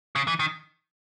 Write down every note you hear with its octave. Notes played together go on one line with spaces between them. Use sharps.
C#3
E3
D#3